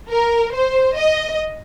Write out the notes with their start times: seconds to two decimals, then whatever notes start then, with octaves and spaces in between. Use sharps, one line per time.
0.11 A#4
0.54 C5
0.97 D#5